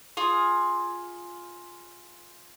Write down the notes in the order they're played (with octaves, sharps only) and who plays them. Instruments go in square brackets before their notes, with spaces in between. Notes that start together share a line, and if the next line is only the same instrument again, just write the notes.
[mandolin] F4 G#4 D#6